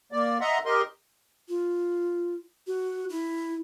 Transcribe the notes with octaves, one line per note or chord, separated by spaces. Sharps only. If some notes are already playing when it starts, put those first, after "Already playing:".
A#3 D5
D#5 E5 F#5 A#5 C6
G4 A#4 D#5 C6
F4
F#4
E4